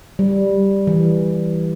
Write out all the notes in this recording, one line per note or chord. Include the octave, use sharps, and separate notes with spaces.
G3
E3